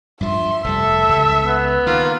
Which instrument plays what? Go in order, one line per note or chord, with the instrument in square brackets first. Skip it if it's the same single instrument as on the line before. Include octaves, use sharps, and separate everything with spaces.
[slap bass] G2 F3 [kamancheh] E5 C6
[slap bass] F1 A#2 G3 [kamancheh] A4 [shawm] E5
[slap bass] C#2
[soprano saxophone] B3
[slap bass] D#3 [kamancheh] A#3 [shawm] F4